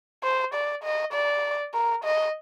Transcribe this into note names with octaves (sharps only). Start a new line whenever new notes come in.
C5
D5
D#5
D5
A#4
D#5